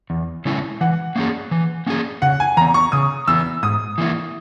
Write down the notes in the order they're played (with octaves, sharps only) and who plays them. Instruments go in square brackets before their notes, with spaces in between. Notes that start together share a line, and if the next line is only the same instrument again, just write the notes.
[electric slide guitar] E2
C#3 G#3 C#4 E4
[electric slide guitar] E3 [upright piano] F#5
[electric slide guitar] A#3 C#4 G#4
E3
A#3 C#4 G#4
[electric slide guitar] C#3 [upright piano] F#5
[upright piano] G#5
[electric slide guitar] E3 B3 [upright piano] A#5
[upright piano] C#6
[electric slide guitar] C#3 [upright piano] D#6
[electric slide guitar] E3 B3 [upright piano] E6
[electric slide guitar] G#2 [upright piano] D#6
[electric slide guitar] E3 A#3 E4